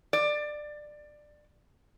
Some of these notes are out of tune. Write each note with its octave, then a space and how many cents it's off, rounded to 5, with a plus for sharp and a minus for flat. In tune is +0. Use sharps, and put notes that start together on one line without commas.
D5 +20